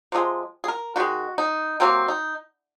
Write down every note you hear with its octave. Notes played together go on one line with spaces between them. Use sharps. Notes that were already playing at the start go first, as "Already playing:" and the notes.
C3 F3 G#3
G#4
A#4
D#3 G#3 F#4
D#4
C3 F#3 A#3 C4
D#4